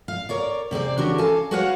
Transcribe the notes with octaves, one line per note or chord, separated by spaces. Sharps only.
F5
A#4 C#5 D5
C3 C4 G#4 D5
C#3 E3 D4 F#4 G4 A#4
A4 F5 G#5 A5
F#4 G#4 B4 C#5 F5 F#5